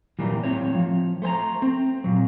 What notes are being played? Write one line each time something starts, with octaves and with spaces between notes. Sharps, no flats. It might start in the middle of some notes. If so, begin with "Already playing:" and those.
A#2 D#3 E3 F#3 G3 A#3
A2 C4 C#5
F3
A3 C5 G#5 A#5
C4
A#2 F#3